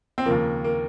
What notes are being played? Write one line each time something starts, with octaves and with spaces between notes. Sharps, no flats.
C4
D#2 C#3 F3 A#3
A#3